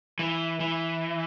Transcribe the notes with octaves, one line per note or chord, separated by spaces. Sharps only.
E3
E3